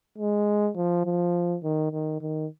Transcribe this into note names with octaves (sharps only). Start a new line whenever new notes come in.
G#3
F3
F3
D#3
D#3
D#3